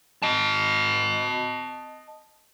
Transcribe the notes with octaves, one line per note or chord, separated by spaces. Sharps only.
D#5 A5